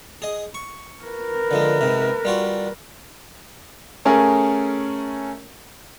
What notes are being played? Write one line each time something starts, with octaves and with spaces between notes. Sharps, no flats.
G#4 D#5
C#6
A#4 B4
D3 F3 G#3
G#2 C3
G3 F4 F#4
A3 C#4 G#4 A#4